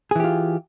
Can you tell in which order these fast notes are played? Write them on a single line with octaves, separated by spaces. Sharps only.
G#4 E3 G4 F4